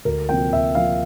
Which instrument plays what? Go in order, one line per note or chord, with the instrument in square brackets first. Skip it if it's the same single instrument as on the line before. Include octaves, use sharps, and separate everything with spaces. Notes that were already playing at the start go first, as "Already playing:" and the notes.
[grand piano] D2 A#4
C3 F3 A#3 G5
D2 E5
C3 F3 A#3 F5